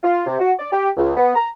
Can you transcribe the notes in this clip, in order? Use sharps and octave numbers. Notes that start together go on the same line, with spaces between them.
F4
C3
F#4
D5
G4
C#2
B3
A#5